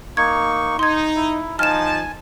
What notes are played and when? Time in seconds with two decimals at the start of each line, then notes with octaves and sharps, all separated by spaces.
0.17 A#3 D#4 C#6 G#6
0.79 D#4 C6 G#6
1.16 E4
1.59 F3 D#4 G#5 A5 F6 E7